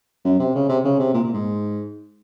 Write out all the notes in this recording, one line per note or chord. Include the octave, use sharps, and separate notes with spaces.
F#2
C3
C#3
C3
C#3
C3
A#2
A#2
G#2